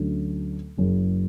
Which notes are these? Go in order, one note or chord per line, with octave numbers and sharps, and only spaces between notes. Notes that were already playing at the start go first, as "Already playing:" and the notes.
Already playing: D2 D3 F#3 A3 C#4
F#1 F#2 C#3